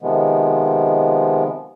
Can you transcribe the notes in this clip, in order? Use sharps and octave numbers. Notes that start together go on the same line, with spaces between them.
C3 D#3 F3 G#3 B3